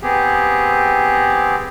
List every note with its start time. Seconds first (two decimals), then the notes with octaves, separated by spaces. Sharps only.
0.01 B3 C4 G4 G#4